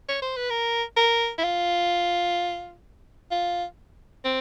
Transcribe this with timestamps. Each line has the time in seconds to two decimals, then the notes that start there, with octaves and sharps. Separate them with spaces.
0.08 C#5
0.22 C5
0.36 B4
0.50 A#4
0.97 A#4
1.38 E4
1.44 F4
3.31 F4
4.24 C4